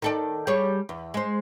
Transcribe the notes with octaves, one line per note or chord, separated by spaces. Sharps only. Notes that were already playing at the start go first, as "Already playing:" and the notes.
D#3 A4 D5
G3 G#4 C#5
E2
G#3 C5